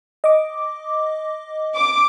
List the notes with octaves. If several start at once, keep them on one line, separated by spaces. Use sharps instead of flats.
D#5 D6
D6